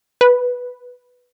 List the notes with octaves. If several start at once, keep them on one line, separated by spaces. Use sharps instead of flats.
B4